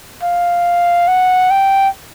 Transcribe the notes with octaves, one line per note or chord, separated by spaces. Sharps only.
F5
F#5
G5